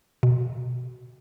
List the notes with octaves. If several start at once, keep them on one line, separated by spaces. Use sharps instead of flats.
B2